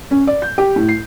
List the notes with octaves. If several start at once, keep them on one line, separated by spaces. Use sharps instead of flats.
C#4
D5
G6
G4
A2
C7